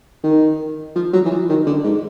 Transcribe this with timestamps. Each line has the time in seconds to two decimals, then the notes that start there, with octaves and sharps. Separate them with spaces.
0.24 D#3
0.96 F3
1.13 F#3
1.25 E3
1.31 F3
1.49 D#3
1.67 D3
1.84 G#2